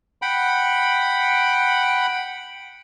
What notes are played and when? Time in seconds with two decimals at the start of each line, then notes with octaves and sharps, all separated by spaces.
0.22 F#5 G5 B5